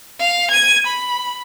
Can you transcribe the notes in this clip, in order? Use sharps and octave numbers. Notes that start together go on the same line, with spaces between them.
F5
G#6 D#7
B5